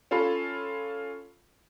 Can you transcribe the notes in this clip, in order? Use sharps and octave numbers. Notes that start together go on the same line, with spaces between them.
C#4 F4 A4 B5